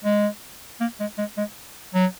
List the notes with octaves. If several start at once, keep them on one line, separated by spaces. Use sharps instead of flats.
G#3
A#3
G#3
G#3
G#3
F#3